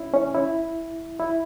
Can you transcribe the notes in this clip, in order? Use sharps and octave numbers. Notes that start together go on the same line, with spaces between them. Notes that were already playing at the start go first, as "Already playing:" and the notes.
Already playing: C#4 E4
C#4
E4
E4